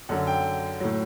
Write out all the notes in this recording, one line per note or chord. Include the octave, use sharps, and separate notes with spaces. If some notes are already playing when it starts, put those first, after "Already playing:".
F#2 D3 F#3 F#5
G5
A2 F#3